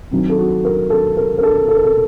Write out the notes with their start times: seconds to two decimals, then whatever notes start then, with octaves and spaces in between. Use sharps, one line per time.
0.11 D#3 F#3 C4
0.30 A4
0.38 F#4
0.65 A#4
0.90 A4
1.17 A#4
1.38 A#4
1.43 A4
1.68 A4
1.76 A#4
1.84 A4